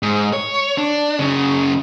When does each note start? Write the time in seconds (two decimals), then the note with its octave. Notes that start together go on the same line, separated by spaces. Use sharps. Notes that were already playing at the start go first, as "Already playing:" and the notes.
0.03 G#2
0.33 C#5
0.78 D4
1.19 F#2 C#3